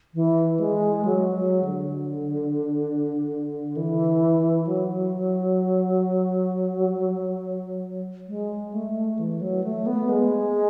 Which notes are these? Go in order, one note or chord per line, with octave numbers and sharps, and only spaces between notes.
E3
G#3
F#3
F#3
D3
E3
F#3
G#3
A3
E3
F#3
A3
B3
G#3